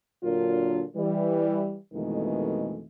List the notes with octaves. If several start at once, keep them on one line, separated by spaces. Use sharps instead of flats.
A#2 D3 F#3 D4 F4 A#4
E3 G3
F2 B2 D#3 E3 G#3 A3